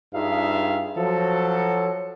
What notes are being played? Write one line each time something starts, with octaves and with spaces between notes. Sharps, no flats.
G2 D#4 F4 G#4 E5 F5
F3 F#3 A4